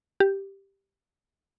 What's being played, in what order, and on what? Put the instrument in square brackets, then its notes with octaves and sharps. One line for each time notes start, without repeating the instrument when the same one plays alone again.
[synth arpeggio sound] G4